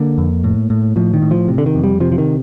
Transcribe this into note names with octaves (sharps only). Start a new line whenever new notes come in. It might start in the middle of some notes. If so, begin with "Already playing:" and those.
Already playing: D3 A#3
F2
A2
A2
A2 F3
D#3
A2
F3
C3
D3
D#3
F2
G3
C3 F3
F3
D#3